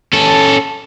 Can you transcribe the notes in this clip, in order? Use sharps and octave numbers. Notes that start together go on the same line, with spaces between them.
C#4 A4